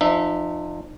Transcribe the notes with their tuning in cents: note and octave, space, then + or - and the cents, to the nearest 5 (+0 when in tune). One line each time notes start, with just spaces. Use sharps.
F3 +0 D#4 -35 E5 +0